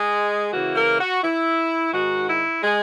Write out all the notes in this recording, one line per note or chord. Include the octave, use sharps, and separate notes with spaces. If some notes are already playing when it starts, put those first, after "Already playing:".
Already playing: G#3 G#4
C#3 E3 A#3 E4 F#4
A#3 A#4
F#4
E4
G#2 D#3 G#3 D#4 F#4
E4
G#3 G#4